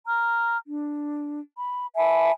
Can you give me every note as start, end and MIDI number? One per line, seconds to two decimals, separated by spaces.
0.07 0.56 82
0.07 0.56 89
0.68 1.40 62
1.57 1.87 83
1.96 2.32 76
1.96 2.32 80
1.96 2.32 81
1.96 2.32 83